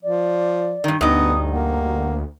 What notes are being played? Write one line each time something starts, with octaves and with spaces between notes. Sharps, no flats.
F3 D5
G2 D#3
D2 G2 B3 D#4 D#6
A#3 F#5